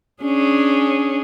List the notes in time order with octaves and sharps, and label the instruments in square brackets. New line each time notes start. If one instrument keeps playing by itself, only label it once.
[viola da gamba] C#4 D4 G#4